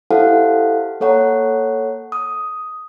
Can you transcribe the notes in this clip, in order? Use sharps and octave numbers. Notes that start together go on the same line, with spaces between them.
E4 G4 A4 C5 F5 F#5
A#3 A4 C#5 F#5 A#5
D#6